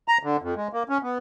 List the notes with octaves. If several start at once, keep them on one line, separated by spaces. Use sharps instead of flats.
A#5
D3
F2
G#3
A#3
C#4
B3